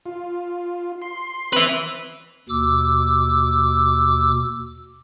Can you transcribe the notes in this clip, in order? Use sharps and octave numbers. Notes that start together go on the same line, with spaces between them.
F4
C6
C4 B4 E5 C6
D#2 B2 D6 E6